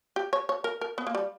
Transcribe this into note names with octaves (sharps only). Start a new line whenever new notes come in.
G4
C#5
C#5
A#4
A#4
B3
A#3
G3